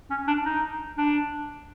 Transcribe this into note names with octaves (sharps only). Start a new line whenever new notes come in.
C#4
D4
D#4
D4